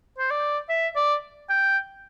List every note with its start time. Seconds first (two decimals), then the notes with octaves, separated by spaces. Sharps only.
0.18 C5
0.31 D5
0.69 E5
0.96 D5
1.50 G5